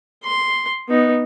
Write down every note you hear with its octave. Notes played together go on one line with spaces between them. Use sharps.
C6
B3 D#4